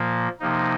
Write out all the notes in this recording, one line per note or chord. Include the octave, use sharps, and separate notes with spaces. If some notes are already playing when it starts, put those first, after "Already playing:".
Already playing: A#2 F3 A#3
C3 F3 A#3 D#4